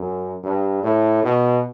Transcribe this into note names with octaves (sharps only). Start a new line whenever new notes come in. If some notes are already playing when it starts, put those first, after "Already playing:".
Already playing: F#2
G2
A2
B2